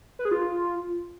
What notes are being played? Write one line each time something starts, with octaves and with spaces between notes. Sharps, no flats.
B4
G#4
F4